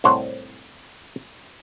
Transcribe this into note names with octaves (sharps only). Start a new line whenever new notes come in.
C2 A2 C5 C#5 F#5